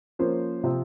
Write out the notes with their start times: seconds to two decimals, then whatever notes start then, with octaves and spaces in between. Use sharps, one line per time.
0.19 F3 A#3 C#4 C5
0.64 C3 F3 C4